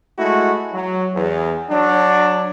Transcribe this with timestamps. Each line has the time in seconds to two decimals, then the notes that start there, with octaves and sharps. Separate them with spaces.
0.19 G#3 A3 E4 F#4
0.73 F#3
1.16 E2
1.71 F#3 D4